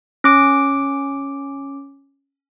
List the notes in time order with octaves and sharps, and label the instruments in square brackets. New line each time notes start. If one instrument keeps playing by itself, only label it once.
[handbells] C#4 D6 D7